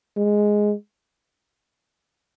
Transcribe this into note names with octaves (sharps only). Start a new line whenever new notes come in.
G#3